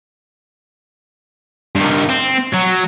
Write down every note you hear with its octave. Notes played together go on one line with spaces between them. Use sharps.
G2 D#3
C4
F#3